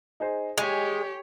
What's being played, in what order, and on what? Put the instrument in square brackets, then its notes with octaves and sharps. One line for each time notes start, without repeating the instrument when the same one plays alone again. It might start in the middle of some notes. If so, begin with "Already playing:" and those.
[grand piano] D#4 G#4 C5
[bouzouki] G#3 [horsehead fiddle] G4 C#5 [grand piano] G#5